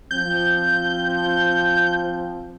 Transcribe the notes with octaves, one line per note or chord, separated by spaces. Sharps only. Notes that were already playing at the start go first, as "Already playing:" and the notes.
F3 C4 G6